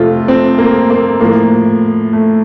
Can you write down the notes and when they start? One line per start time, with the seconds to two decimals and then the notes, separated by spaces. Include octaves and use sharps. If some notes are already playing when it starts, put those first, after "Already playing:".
Already playing: F2 C3 F3 A3 F4
0.28 C4
0.58 A#3
0.90 A#3
1.20 A2 F3 A#3
2.13 A3